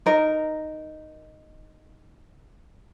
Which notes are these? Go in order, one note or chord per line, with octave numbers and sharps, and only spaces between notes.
D#4 A#4